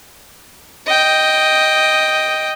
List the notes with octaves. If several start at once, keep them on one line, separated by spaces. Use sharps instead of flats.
D#5 G5